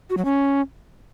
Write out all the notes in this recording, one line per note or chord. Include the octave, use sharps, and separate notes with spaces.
F#4
F#3
C#4